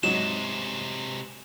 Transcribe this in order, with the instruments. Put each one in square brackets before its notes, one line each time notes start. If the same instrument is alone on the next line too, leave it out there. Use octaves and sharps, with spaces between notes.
[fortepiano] G#2 F#3 [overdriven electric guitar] C3 G#3 [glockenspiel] E7